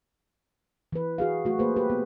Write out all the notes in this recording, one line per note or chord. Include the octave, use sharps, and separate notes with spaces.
E3 B4
F#4 G#4 F5
A3 F#4
A#3 G#4 B4 C5
G4 B4
B3